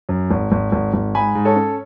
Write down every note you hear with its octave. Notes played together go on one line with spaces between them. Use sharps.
F#2
G#1
G#1
G#1
G#1
G#2 G#5 B5
G#2
A4 C#5
C#4